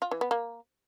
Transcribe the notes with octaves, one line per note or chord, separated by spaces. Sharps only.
F4
E3
B3
A#3